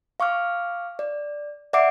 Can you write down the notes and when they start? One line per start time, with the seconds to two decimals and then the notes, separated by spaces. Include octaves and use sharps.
0.20 F5 C#6 D6 F6
0.99 D5
1.73 D5 E5 F#5 D6 C7 D7